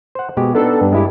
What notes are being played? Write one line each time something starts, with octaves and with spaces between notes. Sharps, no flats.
C5 F#5
B2 G#3 G4
B3 D4 D#4 A4
G2
G#3 E4 G4